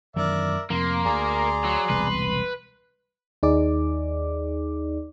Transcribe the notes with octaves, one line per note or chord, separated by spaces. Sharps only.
F#2 D#3 E3 A#4 D5 E5
F2 C3 F3 A#3 C6
D2 G#4 D5 A#5
F#3
E1 C2 B2 B4
D#2 D#4 G#4 D5 D6